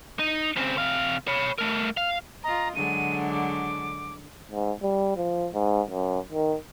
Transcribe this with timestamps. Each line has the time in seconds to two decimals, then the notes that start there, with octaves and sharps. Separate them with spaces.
0.19 D#4
0.56 C#3 C4
0.78 C3 F5
1.27 C#5 B5
1.58 A3 A#4
1.97 F5
2.44 F4 D#5 A#5
2.75 D3 F#3 G#3 D#7
3.31 D6
4.51 G#2
4.82 G3
5.16 F3
5.53 G#2
5.90 F#2
6.32 D#3